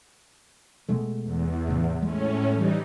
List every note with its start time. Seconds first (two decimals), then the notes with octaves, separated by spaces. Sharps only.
0.89 B2 G#3 A3
1.23 E2
1.68 A2 C#3
2.02 A2 G#3 C#4
2.52 E3 G3 D#4